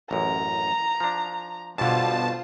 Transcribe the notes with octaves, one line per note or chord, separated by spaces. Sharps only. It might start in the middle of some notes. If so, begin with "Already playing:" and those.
A1 F#2 A#5
F3 D4
G2 B2 D3 F4 C5 A5